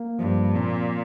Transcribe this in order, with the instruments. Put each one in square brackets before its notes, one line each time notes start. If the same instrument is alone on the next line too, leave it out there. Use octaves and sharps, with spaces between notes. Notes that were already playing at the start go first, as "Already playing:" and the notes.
Already playing: [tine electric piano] A#3
[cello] G2 [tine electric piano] F3
[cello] A#2 [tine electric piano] C4